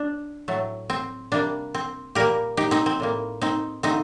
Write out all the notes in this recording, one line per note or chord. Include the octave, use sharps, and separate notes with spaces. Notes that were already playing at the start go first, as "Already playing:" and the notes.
Already playing: D4
A2 F#3 A3
C4
C3 G3 A#3 D4
C4
A#2 G3 A#3 G4 A#4
D#4 G4
C4 D#4
C4
A2 G3 A#3
C4 D#4
D3 A3 C4 D#4